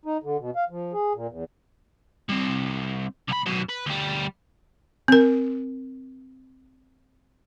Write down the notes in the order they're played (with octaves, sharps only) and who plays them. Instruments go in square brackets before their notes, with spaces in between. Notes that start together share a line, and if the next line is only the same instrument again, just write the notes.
[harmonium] D#4
D3
B2
F5
F3
G#4
A#2
E2
[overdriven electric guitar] G3 C4
C2 B5
F#2 B2
B4
D2 G3
[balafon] C4 A#4